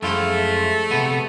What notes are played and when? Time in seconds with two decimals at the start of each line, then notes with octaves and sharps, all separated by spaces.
0.02 F#2 F3 G#3 A3 E4 F4
0.91 C3 B3